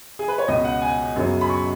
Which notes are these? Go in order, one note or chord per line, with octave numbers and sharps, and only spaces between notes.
G#4
B4
C#5
C#2 B2 B3 D#5
F#5
G#5
F#2 C#3 F#3 B3
B5
C#6